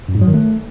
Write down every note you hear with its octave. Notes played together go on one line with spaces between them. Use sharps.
F#2
G#2
F#3
D#3
A3